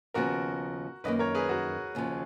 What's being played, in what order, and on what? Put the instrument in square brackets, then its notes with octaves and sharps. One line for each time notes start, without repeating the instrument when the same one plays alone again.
[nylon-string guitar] D#2 C#3 F3 B3 [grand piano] F#4 A#4
[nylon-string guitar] F#2 D#3 A#3 [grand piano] B4 D#5
[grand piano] A#4 C#5
G#4 B4
F#4 A#4
[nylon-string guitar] D#2 C#3 F3